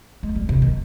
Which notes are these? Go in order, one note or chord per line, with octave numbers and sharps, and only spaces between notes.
G#3
G3
C3
D#3